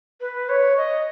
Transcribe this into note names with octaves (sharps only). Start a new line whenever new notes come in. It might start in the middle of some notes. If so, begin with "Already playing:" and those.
B4
C#5
D#5